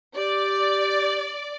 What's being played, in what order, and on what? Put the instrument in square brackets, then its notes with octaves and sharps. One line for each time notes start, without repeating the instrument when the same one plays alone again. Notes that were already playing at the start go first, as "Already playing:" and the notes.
[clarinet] G4 [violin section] D5